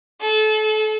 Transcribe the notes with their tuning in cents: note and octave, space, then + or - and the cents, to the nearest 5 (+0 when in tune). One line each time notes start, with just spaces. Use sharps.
A4 -30